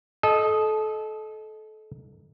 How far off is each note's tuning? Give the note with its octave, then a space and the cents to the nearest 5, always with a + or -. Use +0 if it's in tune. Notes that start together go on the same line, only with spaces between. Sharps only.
A4 -25 D#5 +0